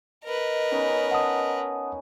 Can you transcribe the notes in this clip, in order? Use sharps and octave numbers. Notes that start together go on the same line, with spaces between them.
A#4 B4 D#5
B3 C#4 D#4
F#5 A5 D#6